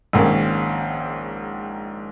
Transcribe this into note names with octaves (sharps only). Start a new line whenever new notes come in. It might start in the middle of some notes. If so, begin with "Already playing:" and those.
A#1 G#2 D#3 A#3 C#4